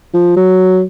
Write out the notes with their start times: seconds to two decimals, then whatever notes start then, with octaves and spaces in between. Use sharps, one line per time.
0.14 F3
0.37 F#3